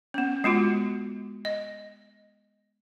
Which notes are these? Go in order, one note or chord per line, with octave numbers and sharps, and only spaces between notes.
B3 C#4
G#3 B3 F4 F#4
D#5